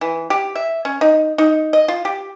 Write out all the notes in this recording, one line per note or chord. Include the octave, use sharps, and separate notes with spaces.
E3
G4
E5
C#4
D#4
D#4
D#5
F4
G4